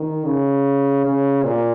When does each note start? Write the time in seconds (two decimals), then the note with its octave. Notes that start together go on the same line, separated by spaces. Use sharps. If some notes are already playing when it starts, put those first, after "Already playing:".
Already playing: D#3
0.25 C#3
1.05 C#3
1.43 A#2